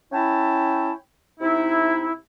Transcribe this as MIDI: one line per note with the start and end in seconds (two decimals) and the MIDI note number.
0.12 0.91 61
0.12 0.91 64
0.12 0.91 76
0.12 0.91 79
0.12 0.91 81
1.39 2.12 48
1.39 2.12 63
1.39 2.12 64